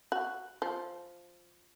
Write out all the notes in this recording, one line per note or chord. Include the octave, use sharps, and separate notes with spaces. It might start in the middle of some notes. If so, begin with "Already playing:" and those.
F#4
F3